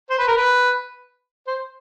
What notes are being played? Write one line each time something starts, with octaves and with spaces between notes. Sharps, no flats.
C5
B4
A#4
B4
C5